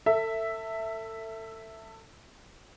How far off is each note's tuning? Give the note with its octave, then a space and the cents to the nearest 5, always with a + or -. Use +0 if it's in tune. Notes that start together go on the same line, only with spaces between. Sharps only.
A4 +30 E5 +0